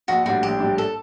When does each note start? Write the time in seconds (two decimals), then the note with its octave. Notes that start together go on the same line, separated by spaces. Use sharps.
0.08 A#1 F#4
0.26 A2 G3 D4 F#4
0.43 A#1 G4
0.60 A2 G3 D4
0.78 A4